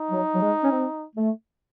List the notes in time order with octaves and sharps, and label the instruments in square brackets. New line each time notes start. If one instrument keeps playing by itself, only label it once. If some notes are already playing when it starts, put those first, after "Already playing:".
Already playing: [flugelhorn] D#4
[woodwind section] F#3
F#3
G#3
C#4
C4
A3